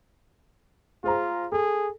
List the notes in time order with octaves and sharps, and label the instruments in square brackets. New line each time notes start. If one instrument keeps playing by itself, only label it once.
[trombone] F4 [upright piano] G#4 C5 A#5
[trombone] G#4 [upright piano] A4